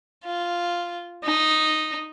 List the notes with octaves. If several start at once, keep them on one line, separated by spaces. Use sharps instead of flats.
F4
D#4